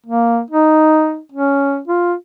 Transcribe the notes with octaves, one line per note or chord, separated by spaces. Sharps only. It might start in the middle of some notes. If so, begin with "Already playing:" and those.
A#3
D#4
C#4
F4